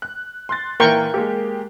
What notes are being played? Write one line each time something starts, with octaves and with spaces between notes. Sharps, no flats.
F#6
C6 F#6 A6
A#2 E3 A#4 G5 C#6
G#3 A#3 G4